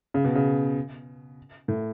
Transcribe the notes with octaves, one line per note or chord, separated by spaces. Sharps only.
C#3
B2
C#3
A2